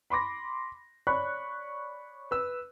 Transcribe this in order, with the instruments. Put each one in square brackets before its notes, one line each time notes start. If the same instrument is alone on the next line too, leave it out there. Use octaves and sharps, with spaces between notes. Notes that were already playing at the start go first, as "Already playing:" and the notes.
[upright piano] B5 C6 D6 A#6
C#5 D5 B5 C#6 F#6
B4 E6